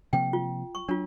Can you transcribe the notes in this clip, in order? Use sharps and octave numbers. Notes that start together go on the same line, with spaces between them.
C3 F3 A#3 G5
F4
C#6
F#3 D4 F4